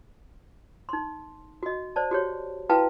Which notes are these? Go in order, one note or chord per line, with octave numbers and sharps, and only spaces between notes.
D#4 C6
F#4 D#5
C5 D5 A5
F#4 G4 C#5
E4 F#4 B4 F5 G5 A5